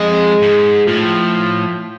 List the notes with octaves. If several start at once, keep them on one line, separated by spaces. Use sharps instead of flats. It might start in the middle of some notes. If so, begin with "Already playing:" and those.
Already playing: F2 G#3
G#2
A2 F3